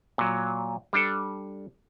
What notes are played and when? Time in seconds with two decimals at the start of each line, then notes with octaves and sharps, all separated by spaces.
0.18 A#2 F#3
0.93 G3 D4 A4